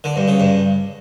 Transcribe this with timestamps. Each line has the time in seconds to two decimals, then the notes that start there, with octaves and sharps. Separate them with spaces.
0.04 D3
0.16 G2
0.28 C#3
0.40 G2